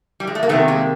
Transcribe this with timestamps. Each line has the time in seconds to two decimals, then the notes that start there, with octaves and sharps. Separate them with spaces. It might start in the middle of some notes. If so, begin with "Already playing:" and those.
0.20 G3
0.27 G#3
0.35 A3
0.43 A#3
0.49 C3 D#3 A3 B3
0.68 G#3 A#3